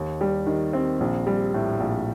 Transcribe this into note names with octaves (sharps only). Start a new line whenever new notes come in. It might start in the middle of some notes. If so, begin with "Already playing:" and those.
Already playing: D#2
G3
D#3
C4
A#1
G3
A2
A#1